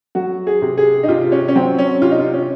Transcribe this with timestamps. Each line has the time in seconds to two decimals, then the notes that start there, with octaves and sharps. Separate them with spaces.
0.15 F#3 F#4
0.47 G#4
0.62 C3
0.77 G#4
1.03 D#4
1.08 C3 F4
1.32 C#4
1.48 C#4
1.55 F#3 C4
1.79 C#4
2.02 C3 F4
2.11 D#4
2.20 F4
2.34 C#4